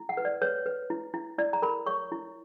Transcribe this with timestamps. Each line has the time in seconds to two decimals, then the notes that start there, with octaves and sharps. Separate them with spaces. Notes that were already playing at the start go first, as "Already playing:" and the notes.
Already playing: E4
0.09 F#5
0.17 B4
0.25 D5
0.42 B4 C#5
0.66 B4
0.90 E4
1.14 E4
1.38 E4 D5
1.53 A#5
1.62 A#4 B5
1.86 C#5 C#6
2.12 E4